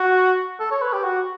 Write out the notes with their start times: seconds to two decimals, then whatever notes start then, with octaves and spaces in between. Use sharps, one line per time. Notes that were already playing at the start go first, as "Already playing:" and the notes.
Already playing: F#4
0.60 A4
0.71 C#5
0.82 B4
0.93 G4
1.04 F#4